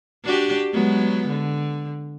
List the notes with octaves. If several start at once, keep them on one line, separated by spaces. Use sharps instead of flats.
D4 F#4 G4
F#3 G#3 B3
D3